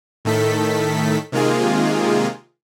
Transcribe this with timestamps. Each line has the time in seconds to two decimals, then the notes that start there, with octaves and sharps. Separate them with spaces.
0.25 A2 D#3 A3 A4 B6
1.32 C3 D#3 G#3 A#3 F4 G#4